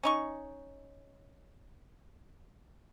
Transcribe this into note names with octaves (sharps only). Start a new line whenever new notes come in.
C#4 D#4 C#6